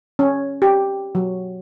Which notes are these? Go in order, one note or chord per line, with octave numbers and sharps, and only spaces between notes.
C#4
G4
F#3